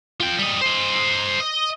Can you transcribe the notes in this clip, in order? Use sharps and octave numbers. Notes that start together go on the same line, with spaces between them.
F4 G5
G3 D#5
C5 D#5
D#5